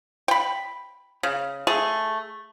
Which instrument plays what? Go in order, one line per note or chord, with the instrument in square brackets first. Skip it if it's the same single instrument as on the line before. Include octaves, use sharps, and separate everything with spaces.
[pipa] G5 B5
C#3
A3 G#4